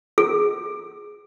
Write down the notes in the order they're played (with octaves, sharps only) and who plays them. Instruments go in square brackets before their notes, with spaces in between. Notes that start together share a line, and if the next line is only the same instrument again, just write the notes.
[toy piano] G#4